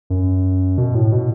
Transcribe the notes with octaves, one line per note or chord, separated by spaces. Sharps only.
F#2
B2
A2
B2